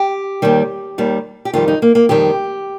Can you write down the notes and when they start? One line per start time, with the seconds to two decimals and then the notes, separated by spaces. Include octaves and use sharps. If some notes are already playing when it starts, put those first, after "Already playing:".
Already playing: G4
0.42 D#2 D#3 G3
0.98 D#2 D#3 G3
1.45 G4
1.53 F2 D#3 G3 F4
1.68 D#4
1.82 A#3
1.95 A#3
2.09 F2 D#3 G3 G4